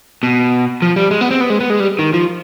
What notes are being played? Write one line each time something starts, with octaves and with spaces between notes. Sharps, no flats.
B2
F3
G3
G#3
B3
C4
B3
G#3
B3
G#3
G3
D#3
F3